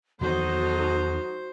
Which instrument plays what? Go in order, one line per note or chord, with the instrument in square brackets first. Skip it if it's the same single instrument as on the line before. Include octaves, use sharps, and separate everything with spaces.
[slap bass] E2 D#3 E3 [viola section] F#3 D#4 A4 [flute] F#4 [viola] C5